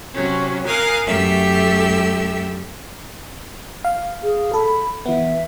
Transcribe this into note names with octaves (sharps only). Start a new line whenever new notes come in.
C3 F#3 C#4
A#4 F5 G#5 D#6 F#6
F#2 A3 G4 A4 E5 E6
F5
G#4
A4 B5
E3 B3 E5